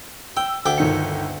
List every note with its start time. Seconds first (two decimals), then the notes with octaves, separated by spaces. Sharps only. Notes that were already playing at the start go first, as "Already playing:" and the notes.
0.37 G5 E6
0.66 D2 G5 D6
0.78 G1 D#3 C#7